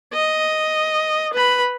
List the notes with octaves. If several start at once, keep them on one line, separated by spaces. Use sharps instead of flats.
D#5
B4 B5